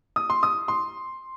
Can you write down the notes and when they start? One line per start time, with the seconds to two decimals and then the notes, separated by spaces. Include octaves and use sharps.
0.16 D#6
0.30 C6
0.43 D#6
0.68 C6